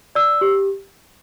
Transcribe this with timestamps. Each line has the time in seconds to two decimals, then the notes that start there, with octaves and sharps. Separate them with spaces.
0.15 D5 E6
0.41 G4